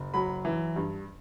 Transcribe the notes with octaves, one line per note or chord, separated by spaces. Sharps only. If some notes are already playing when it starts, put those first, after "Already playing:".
Already playing: F#1
F#3 B5
E3
G2